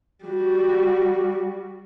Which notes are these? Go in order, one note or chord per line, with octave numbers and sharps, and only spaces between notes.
G3 F#4